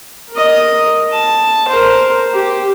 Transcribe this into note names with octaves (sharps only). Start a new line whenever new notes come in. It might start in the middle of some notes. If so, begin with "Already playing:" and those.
A#4 D#5
A5
A#4 C5
G4